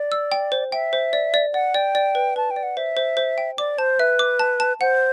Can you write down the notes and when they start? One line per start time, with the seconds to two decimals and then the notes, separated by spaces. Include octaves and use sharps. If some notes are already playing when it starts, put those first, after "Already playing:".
Already playing: D5
0.12 E6
0.32 G5
0.52 C5
0.72 E5 G5
0.93 C5
1.13 D5
1.34 D5
1.54 D5 F#5
1.74 D5 G5
1.95 D5
2.15 B4
2.36 B4 A5
2.51 G5
2.56 D5
2.63 F#5
2.77 C5 E5
2.97 C5
3.17 C5
3.38 G5
3.58 D5 D6
3.78 C5 A5
3.99 B4 E5
4.19 D6
4.39 A5
4.60 A5
4.81 C5 F#5